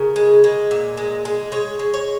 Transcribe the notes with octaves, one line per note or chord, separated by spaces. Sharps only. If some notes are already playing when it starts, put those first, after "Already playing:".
Already playing: C#3 A#4
G#3
G#3
A#2
G#3
G#3
G#3 C#5
G#3
C#5